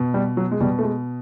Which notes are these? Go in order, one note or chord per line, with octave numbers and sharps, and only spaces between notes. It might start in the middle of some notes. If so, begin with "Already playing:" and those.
Already playing: B2
G3
F#3
G#3
B2 G3
A3
G#3